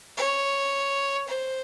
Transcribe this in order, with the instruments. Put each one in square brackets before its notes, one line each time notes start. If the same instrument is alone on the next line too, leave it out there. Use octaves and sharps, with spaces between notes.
[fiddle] C#5
C5